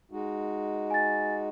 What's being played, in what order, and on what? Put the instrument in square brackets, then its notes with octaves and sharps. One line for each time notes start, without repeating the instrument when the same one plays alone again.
[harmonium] G#3 D#4 F#4
[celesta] G#5 A6